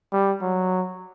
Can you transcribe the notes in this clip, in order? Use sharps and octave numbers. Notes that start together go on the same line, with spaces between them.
G3
F#3